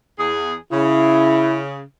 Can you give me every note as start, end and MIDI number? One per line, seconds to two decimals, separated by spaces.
0.19 0.54 40
0.19 0.54 68
0.72 1.81 49
0.72 1.60 64